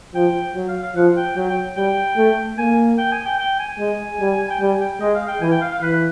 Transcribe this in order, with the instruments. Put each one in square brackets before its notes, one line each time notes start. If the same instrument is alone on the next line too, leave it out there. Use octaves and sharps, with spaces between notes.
[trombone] F3 [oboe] G5
[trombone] F#3
[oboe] F5
F5
[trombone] F3 [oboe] F#5
[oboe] G5
[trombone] F#3 [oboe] G5
[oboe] G5
[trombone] G3 [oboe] G5
[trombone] A3
[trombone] A#3 [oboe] G#5
[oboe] G5
G#5
G5
G5
G#5
[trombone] G#3
G3
[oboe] G5
[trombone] G3 [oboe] G#5
[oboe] G5
[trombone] G#3 [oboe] D#5
[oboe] F5
G5
[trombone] E3 [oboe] G#5
[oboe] G5
F5
F5
[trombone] E3 [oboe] B4
[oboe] B4